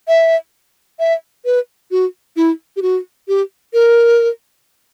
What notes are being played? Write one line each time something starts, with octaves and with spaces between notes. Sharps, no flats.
E5
E5
B4
F#4
E4
G4
F#4
G4
A#4